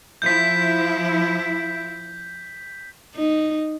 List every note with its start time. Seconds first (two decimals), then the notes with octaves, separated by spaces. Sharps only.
0.22 F3 E4 G6 B6
3.15 D#4